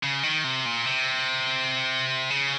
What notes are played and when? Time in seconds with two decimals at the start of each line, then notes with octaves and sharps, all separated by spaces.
0.03 C#3
0.23 D#3
0.44 C3
0.66 A#2
0.85 C3
2.30 C#3